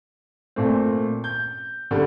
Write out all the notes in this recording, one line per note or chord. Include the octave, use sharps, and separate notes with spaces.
A#2 A3 C4
G6
D3 G3